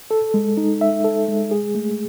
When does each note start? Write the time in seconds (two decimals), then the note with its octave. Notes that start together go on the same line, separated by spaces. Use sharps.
0.11 A4
0.34 G#3
0.57 D#4
0.81 E5
1.04 A4
1.28 G#3
1.51 G#4
1.75 A3